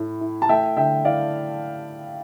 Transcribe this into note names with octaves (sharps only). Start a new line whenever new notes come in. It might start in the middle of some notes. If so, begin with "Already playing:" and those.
Already playing: A2 A3 E4
E4
A5
A3 E5 G5
D3 E5 G5
E4 D5 F5